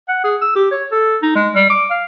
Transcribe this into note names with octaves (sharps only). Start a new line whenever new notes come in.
F#5
G#4
E6
G4
C#5
A4
D#4
G#3
G3
D6
F5